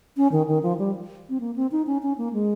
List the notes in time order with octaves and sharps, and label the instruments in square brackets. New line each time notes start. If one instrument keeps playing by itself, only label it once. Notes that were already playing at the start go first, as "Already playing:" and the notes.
[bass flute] C#4
D#3
D#3
F3
G3
C4
A#3
C4
D#4
C#4
C#4
A#3
G#3